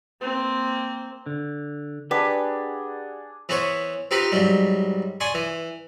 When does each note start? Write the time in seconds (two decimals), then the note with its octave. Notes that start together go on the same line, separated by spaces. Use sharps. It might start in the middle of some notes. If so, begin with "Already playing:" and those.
0.21 A#3 C4
1.26 D3
2.11 D4 G4 G#4 B4 F#5
3.49 E3 B3 C5 C#5
4.11 C4 D#4 F4 G4 B4 C6
4.32 G#2 F#3 G3
5.20 D5 G#5 C6 C#6 D#6
5.34 E3